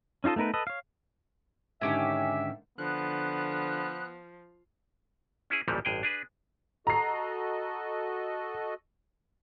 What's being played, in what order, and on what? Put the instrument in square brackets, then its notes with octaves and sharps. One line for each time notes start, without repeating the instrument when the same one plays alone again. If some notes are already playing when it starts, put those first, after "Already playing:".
[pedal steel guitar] C#4 D#4 F4 A4 D#5
A3 B3 D#4 A#4 B4
A4 B4 D#5
C#5 F5
[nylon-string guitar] G#2 D3 D#3 [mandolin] C#4 G4 G#5 [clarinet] E5
[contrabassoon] D3 [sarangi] F3 [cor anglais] B3 [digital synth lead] F#6
[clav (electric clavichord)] C#4 E4 G#4
A1 D2 A#2 E3 F3 G3
A1 G2 G#4 G5
D4 G#4 B4
[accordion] F#4 A4 D#5 [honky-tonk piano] A#5 C7